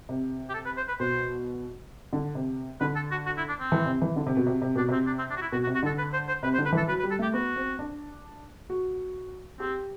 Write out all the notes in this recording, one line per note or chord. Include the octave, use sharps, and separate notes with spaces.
C3
G4
A4
B4
C5
B4
B2 C5
D3
C3
D3 B4
A4
F#4
F#4
E4
D4
C4
E3
C3
E3
D3
C3
B2
C3
C3
B2 D4
C3 C4
D4
C4
D4
F#4
E4
B2 F#4
F#4
C3
F#4
D3 A4
B4
C5
C5
C3 B4
C5
D3
B4
E3 A4
F#3 B4
B4
G3
A4
A3 G4
B3 F#4
C4
D4
F#4
C4 G4